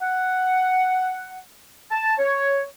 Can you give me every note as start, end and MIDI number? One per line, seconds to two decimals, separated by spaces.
0.02 1.39 78
1.91 2.14 81
2.19 2.63 73